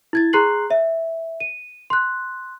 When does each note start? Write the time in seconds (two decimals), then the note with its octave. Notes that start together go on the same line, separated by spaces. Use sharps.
0.13 E4 G#6 A6
0.33 G#4 A#5 C6 F#6 C7 F#7
0.70 C#5 E5
1.40 D#7
1.90 C6 F#6